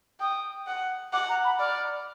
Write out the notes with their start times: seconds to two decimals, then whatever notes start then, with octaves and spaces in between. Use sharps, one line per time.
0.20 G5 D#6
0.67 F#5
1.13 F#5 D6
1.29 A#5
1.44 B5
1.59 D5 F6